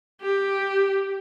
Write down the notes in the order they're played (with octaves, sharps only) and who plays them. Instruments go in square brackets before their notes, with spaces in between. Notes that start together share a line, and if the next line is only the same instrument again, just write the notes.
[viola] G4